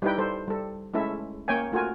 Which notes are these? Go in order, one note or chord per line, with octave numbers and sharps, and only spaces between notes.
G3 D#4 E4 G4 B4 G5
G3 A4 C5
G3 A4
G#3 A3 C#4 E4 A4 E5
A#3 C#4 C#5 G5 G#5
A3 F4 F#4 A#4 G#5